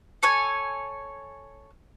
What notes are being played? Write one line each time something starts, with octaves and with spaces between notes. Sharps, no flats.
A4 C#5 G#5